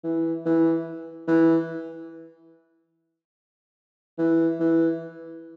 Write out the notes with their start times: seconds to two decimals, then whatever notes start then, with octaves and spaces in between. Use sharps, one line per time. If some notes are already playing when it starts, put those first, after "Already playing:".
0.04 E3
0.46 E3
1.28 E3
4.18 E3
4.60 E3